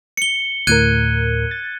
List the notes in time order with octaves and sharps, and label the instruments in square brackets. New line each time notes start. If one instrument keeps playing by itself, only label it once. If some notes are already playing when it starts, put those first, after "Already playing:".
[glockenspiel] C#7 G7
[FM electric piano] D2 A2 A#4 [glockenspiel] F#6 G#6 D#7
[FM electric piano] A6